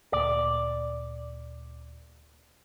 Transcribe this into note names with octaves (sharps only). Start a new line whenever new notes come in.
D2 A#2 D5